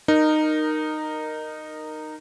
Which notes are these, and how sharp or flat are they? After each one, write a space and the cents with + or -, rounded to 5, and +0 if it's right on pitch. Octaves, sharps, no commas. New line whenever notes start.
D#4 -15 A#4 +0